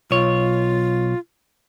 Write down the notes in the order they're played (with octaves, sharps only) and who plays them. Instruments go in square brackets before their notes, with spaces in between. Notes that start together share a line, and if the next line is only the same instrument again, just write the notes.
[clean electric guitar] B1 C#5 [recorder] F4